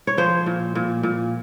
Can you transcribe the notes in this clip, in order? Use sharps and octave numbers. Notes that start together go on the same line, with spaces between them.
C#5
F3 C5
A#2
A#2
A#2